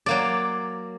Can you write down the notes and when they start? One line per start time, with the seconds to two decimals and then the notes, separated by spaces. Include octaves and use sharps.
0.06 F#3 A#3 D5